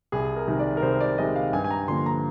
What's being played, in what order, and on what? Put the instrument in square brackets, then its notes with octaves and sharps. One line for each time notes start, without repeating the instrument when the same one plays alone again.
[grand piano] C2 G#4
A#4
C3 D#3 G#3
D5
A#4
C2 C5
D5
C3 D#3 G#3 D#5
F5
G2 G#5
G#5
A#5
D3 F3 A#3 C6
A#5